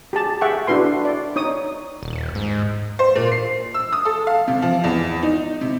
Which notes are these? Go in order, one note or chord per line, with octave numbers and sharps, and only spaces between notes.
G4 G#4 A5
G#4 E5 F#5 G5 C#6
D4 E4 F#4 B4 C6
D5
D#4 C#5 D#6
D#1
G#2
C5
A#2
C7
E6
D#6
A4
F5
C3
F3
E2
D#4
C3